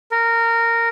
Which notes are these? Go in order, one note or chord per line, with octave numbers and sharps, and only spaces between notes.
A#4